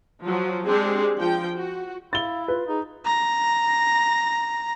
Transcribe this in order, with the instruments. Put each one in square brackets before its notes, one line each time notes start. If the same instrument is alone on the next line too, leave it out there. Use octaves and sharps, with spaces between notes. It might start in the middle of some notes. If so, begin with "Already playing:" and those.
[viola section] F3 F#3
G#3 C4 D4 G4 G#4
F3 G5
F#4
[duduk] E4 [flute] F5 [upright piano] A6 G7
[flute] F4 [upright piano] B4
[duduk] D#4 [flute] G#4
[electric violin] A#5 A#6